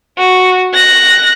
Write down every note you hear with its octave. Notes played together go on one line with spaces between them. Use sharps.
F#4
F#6 A#6